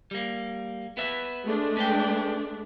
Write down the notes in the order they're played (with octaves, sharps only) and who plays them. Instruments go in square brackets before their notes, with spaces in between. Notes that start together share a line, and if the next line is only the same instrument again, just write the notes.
[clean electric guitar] G3 A#3
B3 B4 E5
[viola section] G#3 A3 D4
[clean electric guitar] C#4 B4 G5